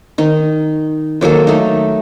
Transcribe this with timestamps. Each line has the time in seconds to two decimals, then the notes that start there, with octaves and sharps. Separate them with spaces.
0.18 D#3 D#4
1.21 D#3 F#3 A#3 A4
1.47 A3 D#4